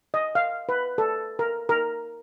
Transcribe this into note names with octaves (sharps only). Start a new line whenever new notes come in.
D#5
F5
B4
A4
A#4
A#4